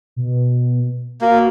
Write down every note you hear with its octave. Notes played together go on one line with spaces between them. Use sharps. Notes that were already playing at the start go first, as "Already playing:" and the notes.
B2
A#3 F#4